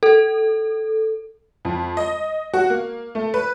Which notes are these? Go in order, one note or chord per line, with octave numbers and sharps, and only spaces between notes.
A4
F2
D#5
F#4
A#3
A3
B4